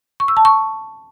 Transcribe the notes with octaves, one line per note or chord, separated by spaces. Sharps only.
C#6
E6
A5
C#6